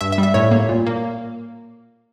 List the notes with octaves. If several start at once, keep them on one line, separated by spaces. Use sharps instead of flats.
G2 E5
E5
G3
E5
A2 C#5
A#3
A#2
A#3